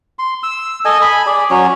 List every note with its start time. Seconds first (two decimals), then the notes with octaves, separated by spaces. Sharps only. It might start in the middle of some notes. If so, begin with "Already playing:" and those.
0.19 C6
0.43 E6
0.85 A4 D#5 G#5
1.02 G#5 B5
1.26 G#4 D5
1.50 F#3 C#4 C#5